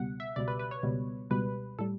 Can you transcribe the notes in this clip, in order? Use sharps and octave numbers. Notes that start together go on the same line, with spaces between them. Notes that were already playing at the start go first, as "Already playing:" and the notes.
Already playing: C#2 B2 G3 F#5
E5
C#2 B2 G3 D5
B4
B4
C#5
C#2 B2 G3
C#2 B2 G3 B4
A2 G3 A4